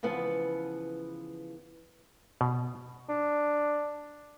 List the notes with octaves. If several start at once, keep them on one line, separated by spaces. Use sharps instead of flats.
C#3 E3 F3 B3
B2
D4